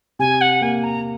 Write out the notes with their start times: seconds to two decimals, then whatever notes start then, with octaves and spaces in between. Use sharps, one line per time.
0.19 C3 G#5
0.41 F#5
0.61 A#3 G#5
0.83 A#5